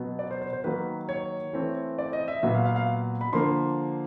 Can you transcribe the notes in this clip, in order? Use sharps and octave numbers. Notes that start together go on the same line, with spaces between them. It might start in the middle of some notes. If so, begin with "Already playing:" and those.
Already playing: B2 F#3 B3
D5
C5
C5
C5
D#3 F#3 A#3 B4
C#5
E3 A3 C4
D5
D#5
E5
A#2 F#3 B3 E5
F5
F5
F5
B5
D3 F3 A#3 C6